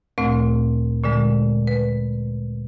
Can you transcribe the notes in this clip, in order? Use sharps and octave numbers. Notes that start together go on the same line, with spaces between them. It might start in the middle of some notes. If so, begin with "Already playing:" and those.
D2 A#2 A3 C4
A#2 D3 G#3
B4